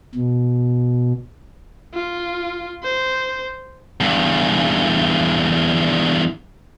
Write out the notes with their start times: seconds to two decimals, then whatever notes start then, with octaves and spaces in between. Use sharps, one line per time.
0.15 B2
1.94 F4
2.83 C5
4.01 E2 G2